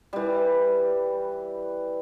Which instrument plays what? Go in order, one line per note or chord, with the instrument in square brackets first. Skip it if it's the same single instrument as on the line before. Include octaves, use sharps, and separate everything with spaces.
[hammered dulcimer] E3 G3